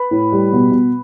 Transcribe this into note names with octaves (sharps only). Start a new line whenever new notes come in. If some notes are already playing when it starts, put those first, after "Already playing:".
Already playing: B4 B5
A2
G3
B2
B2